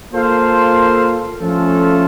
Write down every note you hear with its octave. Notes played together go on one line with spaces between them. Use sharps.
A#3 F4 A4 C5 F5
F3 A3 C#4 F4 A4